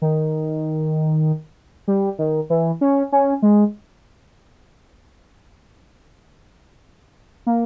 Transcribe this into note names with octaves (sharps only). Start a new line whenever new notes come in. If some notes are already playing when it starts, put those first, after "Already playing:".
D#3
G3
D#3
E3
C#4
C#4
G#3
A#3